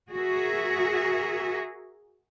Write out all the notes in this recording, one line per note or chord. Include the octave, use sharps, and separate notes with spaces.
F#4 G#4 A#4 E5